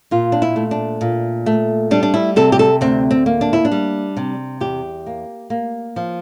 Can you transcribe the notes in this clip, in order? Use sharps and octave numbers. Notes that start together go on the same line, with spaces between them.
A#2 F4
D4
E4
A3
D4
A#2
A3
G3 D4
D4
E4
C3 A4
G4
A4
D2 C4
C4
A#3
D4
E4
D4
G3
C3
E2 G4
A#3
A#3
F3